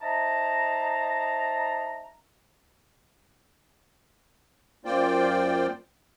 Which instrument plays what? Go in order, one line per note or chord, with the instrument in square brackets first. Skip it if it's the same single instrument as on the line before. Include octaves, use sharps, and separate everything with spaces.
[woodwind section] D#4 C5 E5 A5 A#5
[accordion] F#2 A#3 F4 C5 D5 G5